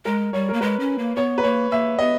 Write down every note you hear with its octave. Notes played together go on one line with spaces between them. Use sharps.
G#3 A#4
G3 C#5
A#3 A#4
G#3 B4
C#4
A#3
B3 C#5
B4
A#3 C#5
A#3 E5
B3 D#5